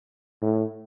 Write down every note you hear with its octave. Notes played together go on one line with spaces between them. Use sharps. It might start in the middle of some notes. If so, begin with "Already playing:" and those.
A2